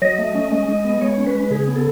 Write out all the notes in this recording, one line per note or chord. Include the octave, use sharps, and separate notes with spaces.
F#3 D#5
A3
C#4
G#3 D#5
G#3
B3
G#3 C#5
C#4
B4
G#3
C#3 G#4
B3
A4